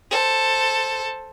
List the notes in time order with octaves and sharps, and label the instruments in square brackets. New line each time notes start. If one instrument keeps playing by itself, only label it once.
[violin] A4 C5